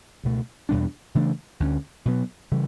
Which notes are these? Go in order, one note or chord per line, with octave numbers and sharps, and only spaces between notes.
C#2 B2 A3
E2 B2 G3 D4
C#3 E3 A3 D4
D2 D3 F#3 C#4
B2 F#3 B3
C#3 E3 G3